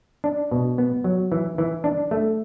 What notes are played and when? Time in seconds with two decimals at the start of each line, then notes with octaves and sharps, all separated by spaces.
0.24 D4
0.51 B2
0.78 B3
1.04 F#3
1.32 E3
1.58 E3
1.84 D4
2.11 A3